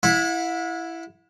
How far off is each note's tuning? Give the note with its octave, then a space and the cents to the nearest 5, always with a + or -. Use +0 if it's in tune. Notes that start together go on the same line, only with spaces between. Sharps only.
E4 +10 F#5 -40 B5 +0